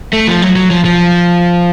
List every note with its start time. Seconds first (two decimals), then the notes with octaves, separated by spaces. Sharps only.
0.13 A3
0.27 F3
0.42 F#3
0.56 F#3
0.71 F3
0.85 F3